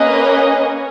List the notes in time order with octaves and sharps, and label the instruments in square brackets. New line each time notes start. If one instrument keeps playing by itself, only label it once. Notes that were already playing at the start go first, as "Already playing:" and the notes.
Already playing: [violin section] A#3 C#4 G#4 B4 D#5
C#4